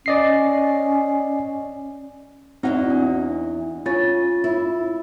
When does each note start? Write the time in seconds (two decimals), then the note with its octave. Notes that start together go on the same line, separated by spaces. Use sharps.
0.06 C#4 D5 D#5 C7
2.63 E2 G2 C4 D#4 F#4 F#5
2.90 D4
3.86 C#4 F4 A6
4.44 E4